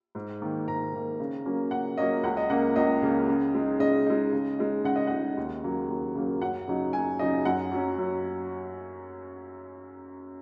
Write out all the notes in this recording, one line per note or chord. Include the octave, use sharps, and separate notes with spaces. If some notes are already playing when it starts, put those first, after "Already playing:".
G#2
D#3 A#3
G#2 A#5
D#3 A#3
C#3
F#3 A#3 C#4
C#3 F#5
F#3 A#3 C#4 D#5
C#2 F#5
D#5
C#3 A#3 F#5
C#2 D#5
C#3 A#3
C#3
G#3 D#4
C#3 D#5
G#3 D#4
C#3
G#3 D#4
C#3 F#5
D#5
G#3 D#4 F#5
D#2
C#3 F#3 A#3
D#2
C#3 F#3 A#3
F#2 F#5
C#3 F#3 D#4
F#2 G#5
C#3 F#3 D#4 D#5
F#2 F#5
F#3 C#4
F#2